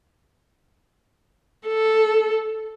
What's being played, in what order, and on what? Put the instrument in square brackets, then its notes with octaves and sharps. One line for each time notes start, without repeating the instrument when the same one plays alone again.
[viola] A4